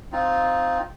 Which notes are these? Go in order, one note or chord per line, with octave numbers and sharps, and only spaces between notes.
C4 D#4 F4